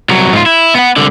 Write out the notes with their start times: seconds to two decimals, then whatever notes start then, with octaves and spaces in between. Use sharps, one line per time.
0.09 C2 F#3
0.33 G#2 F4
0.46 E4
0.75 B3 F#5
0.96 C2 D3